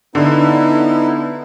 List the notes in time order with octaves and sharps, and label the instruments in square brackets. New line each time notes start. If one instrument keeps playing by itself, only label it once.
[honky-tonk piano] D3 [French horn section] B3 [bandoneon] D#4 E4